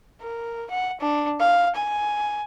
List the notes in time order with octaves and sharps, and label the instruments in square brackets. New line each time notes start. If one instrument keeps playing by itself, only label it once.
[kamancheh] A#4
F#5
D4
F5
G#5